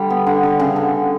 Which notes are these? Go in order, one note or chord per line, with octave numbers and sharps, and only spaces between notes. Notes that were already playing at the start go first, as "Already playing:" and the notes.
Already playing: D3 G3
B3
D3
D3
C#3
D3